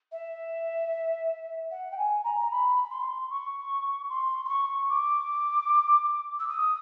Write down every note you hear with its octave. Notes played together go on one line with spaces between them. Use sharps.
E5
F#5
G5
G#5
A#5
A#5
B5
B5
C6
C#6
C6
C6
C#6
D6
E6
D#6